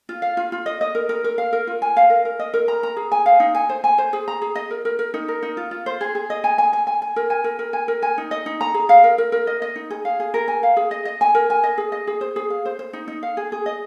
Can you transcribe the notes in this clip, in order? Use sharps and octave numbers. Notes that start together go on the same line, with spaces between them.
F4
F5
F4
F4
D#5
D#5
A#4
A#4
A#4
F5
A#4
F4
G#5
F5
A#4
A#4
D#5
A#4
A#5
A#5
G#4
G#5
F5
D#4
G#5
C5
G#5
C5
G#4
A#5
G#4
D#5
A#4
A#4
A#4
D#4
A#4
D#4
F4
F4
C5
G#4
G#4
D#5
G#5
G#5
G#5
G#5
G#5
A#4
G#5
A#4
A#4
G#5
A#4
G#5
D#4
D#5
D#4
A#5
G#4
F5
A#4
A#4
A#4
D#5
D#5
D#4
G#4
F5
G#4
A#4
G#5
F5
G#4
D#5
D#5
G#5
A#4
G#5
D#5
G#4
D#5
G#4
C5
G#4
F5
C5
C5
D#4
D#4
F5
G#4
G#4
D#5